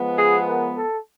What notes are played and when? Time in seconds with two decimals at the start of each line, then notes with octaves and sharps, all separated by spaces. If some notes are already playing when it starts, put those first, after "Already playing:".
Already playing: F3 G#3 B3
0.18 G#4
0.48 A#4
0.76 A4